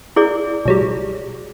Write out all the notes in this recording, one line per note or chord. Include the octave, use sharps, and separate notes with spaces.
E4 G#4 D5
B1 F#3 G3